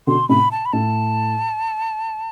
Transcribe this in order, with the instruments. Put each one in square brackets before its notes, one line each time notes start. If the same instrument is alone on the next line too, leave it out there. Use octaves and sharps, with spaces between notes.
[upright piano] B2 D3 [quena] C6
[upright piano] A2 C3 [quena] B5
[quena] A5
B5
[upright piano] A2 [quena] A5